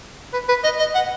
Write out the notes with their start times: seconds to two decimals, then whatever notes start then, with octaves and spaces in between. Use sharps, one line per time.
0.33 B4
0.49 B4
0.64 D#5
0.79 D#5
0.95 F#5